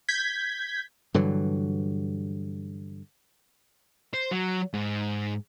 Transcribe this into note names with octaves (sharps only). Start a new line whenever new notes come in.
G6 G#6 B6
G2 D3 E3 F#3
C5
F#3
G#2